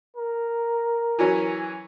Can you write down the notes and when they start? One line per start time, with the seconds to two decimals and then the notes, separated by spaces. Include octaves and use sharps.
0.17 A#4
1.19 E3 F#3 C#4